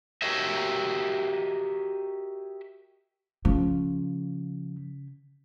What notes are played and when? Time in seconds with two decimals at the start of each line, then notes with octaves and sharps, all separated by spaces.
0.22 F#4 G4 A#4 C#5 D#5 E5
3.45 C#3 F3